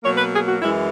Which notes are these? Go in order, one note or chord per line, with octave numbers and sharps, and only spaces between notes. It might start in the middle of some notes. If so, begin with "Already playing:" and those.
B2 F#3 A#3 C#5
B4
G#4
F#4
F#2 E3 G#3 E4